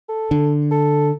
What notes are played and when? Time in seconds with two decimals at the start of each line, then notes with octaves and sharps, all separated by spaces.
0.09 A4
0.31 D3
0.71 A4